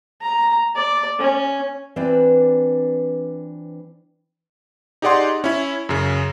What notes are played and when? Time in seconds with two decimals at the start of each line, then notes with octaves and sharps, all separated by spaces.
0.21 A#5
0.76 D5
1.19 C#4
1.96 E3 C4 D4 F4 B4 D5
5.02 D#4 G4 G#4 D5 F#5 C6
5.44 C#4 E4
5.89 F#2 C#3